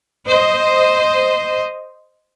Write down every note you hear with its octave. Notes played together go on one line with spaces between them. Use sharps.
C5 D#5